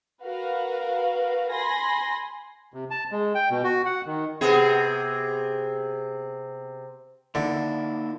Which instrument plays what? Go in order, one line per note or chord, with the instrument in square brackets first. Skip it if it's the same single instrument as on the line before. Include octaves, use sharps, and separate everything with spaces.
[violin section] F#4 A#4 B4 F5
G#5 B5 C6 A#6
[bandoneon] C3
A5
G#3
G5
B2
F#4
F#5
D#3
[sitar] C3 B3 G#4
[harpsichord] D3 [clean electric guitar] A#3 D#4 E4